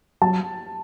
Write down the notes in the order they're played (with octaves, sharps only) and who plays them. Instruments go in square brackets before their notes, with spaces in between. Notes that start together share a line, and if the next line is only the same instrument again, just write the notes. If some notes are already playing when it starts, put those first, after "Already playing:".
[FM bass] F#3 [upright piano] A5